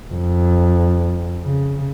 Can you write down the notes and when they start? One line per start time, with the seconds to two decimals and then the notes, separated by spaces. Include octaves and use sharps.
0.13 F2
1.42 C#3